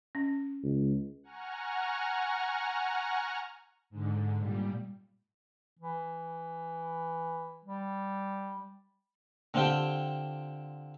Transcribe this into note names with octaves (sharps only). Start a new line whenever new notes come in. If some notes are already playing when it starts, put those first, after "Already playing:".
C#4
C#2
F#5 G#5 A#5 C#6 F6
G#2 D3
A#2 G3
E3
G3
D3 C4 D4 F4 G4